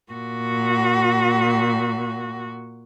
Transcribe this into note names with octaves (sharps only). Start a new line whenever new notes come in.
A#2 F#4